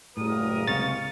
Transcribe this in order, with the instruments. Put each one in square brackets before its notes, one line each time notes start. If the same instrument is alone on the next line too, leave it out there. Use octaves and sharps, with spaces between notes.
[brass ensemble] F#1 G3 A#4 [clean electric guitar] A2 [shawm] D#6
[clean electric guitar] C#2 C3 F5 [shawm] C#6 [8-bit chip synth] A6